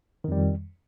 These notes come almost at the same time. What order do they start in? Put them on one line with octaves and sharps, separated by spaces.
D#3 F2 G3